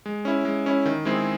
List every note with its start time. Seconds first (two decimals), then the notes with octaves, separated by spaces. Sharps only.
0.06 G#3
0.25 C#4 E4
0.45 G#3
0.66 C#4 E4
0.86 D#3
1.05 G#3 C4 E4 G#4